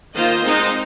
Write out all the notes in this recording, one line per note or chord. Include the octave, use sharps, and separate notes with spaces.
D#3 A#3 F4 C5 D#5
G#3 C4 D#4